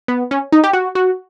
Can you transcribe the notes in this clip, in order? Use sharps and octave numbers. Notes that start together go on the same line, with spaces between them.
B3
C#4
D#4
G4
F#4
F#4